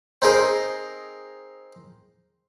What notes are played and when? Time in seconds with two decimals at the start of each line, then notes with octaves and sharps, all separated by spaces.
0.22 C4 D#4 G#4 A#4 D#5